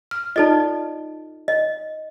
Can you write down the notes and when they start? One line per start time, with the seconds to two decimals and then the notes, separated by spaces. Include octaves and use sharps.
0.11 F6
0.36 D#4 F4 A4 D5 D#5
1.48 D#5